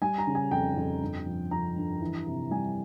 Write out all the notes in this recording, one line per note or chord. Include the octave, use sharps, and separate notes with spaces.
G3 G#5
A#5
C#3
G#5
F2 G5
F2
G2
F3
F3 A#5
G2
E3
C3
G3 G#5